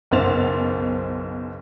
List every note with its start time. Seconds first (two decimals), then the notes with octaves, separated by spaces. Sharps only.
0.11 F#1 B1 B3 C5 A6 F7